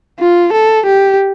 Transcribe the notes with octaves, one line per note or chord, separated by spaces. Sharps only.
F4
A4
G4